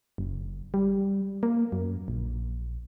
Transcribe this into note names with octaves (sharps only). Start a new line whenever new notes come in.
F#1
G3
A#3
F#2
A#1